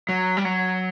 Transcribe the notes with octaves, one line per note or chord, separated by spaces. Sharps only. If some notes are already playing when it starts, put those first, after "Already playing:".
F#3
G3
F#3